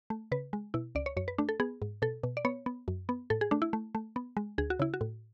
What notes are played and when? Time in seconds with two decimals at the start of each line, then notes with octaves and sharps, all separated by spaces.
0.10 A3
0.32 C#3 B4
0.53 G#3
0.74 B2 E4
0.95 C#2 D5
1.06 C#5
1.17 F#2 C#5
1.28 B4
1.38 A3 D4
1.49 A4
1.60 B3 G#4
1.82 G#2
2.02 B2 A4
2.23 B2
2.37 D5
2.45 B3 C#5
2.66 B3
2.88 F#2
3.09 B3
3.30 A2 A4
3.41 G#4
3.51 A3 D4
3.62 E4
3.73 A3
3.95 A3
4.16 B3
4.37 G#3
4.58 D2 G#4
4.70 F#4
4.80 C#3 E4
4.94 F#4
5.01 A2